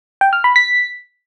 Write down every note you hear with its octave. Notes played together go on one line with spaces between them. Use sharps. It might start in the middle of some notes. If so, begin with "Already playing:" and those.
G5
F6
B5
B6